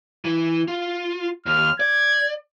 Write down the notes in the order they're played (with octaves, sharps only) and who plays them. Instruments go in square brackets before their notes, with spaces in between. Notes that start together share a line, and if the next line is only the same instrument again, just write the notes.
[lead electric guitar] E3
F4
[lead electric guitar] D#2 [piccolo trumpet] F6
[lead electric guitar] D5 [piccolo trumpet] G#6